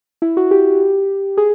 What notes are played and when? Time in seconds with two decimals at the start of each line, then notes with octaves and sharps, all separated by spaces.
0.22 E4
0.37 F#4
0.51 G4
1.37 G#4